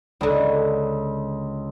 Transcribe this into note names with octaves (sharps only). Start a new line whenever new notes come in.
C#2 D3 D4